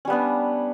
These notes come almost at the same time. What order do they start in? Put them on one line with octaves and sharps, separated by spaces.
C#4 G3 B3 D4